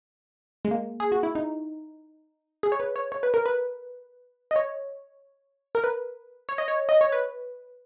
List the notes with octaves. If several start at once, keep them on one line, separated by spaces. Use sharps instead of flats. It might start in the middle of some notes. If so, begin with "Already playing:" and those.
G#3
A#3
G#4
F#4
E4
D#4
G#4
C#5
B4
C#5
C#5
B4
A#4
B4
D#5
C#5
A#4
B4
C#5
D#5
C#5
D#5
C#5
B4